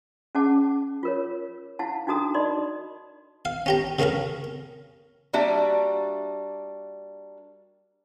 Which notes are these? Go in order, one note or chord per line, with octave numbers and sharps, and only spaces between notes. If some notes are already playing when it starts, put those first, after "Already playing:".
C#4 G#4 F#5 A5 D6
F4 A#4 C#5
E4 F5 F#5 A5
D4 D#4 F#4 A4 A#5 D#6
D#4 A#4 D5 D#5 B5 C6
F5
C#4 G4 A#5
C#3 A#3 C#4 G#4 A#4
G3 A#3 D4 F#4 D5 E5